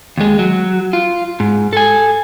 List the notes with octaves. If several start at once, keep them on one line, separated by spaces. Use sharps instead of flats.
D#2 G#3
F#3
F4
G#2
A4 G#5